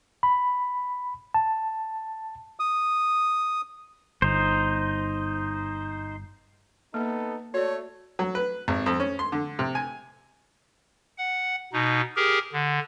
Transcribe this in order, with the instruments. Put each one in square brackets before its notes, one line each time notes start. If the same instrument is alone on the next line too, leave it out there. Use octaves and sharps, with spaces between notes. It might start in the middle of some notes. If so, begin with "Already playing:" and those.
[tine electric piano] B5
A5
[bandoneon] D#6
[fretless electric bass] G1 [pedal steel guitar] D#4 C5
[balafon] A#3 [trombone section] B3 D#4 A4
[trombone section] A3 [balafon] F#4 D5 [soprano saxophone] C#5
[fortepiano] F#3
B4
G#1
F2
C#4
C6
D3
C3
G#5
[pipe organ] F#5
B2 D#4
G4 G#4 A#4
D3